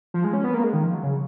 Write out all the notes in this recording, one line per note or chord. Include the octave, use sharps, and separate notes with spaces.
F3
G#3
C#4
B3
A#3
G#3
D#3
F3
F#3
C#3